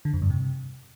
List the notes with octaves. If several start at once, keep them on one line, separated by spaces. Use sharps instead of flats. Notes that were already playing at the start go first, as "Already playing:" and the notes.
D3
F2
G2
C3